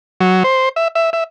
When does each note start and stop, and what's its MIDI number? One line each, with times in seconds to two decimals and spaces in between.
0.21 0.43 54
0.44 0.69 72
0.76 0.88 76
0.95 1.10 76
1.13 1.24 76